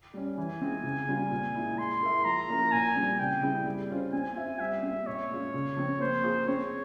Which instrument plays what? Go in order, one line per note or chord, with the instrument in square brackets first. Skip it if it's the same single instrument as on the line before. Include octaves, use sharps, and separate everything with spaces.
[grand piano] G3 C#4
[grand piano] E3 [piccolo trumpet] G#5
[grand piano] G#3 C4 F4
C#3
G3 C4 F4
A#2
G#3 E4
[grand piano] G#3 [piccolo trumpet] C6
[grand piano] E4 A#4 E5
[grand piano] F3 [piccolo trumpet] A#5
[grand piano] A#3 C#4 E4 A#4
[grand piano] A#2 [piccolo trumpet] G#5
[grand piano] G3 C4
[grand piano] C#3 [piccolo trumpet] G5
[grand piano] G3 C4 E4 G#4
G3
C#4 F4 C5
[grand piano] C4 [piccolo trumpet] G#5
[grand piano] F4 C5 E5
[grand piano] G3 [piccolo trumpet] E5
[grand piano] C4 F4
[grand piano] A#2 [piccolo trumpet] C#5
[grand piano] G#3 C#4 F4
C#3
F3 C4
[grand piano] A#3 [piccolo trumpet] C5
[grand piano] F4 G#4
[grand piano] C4 [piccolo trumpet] C#5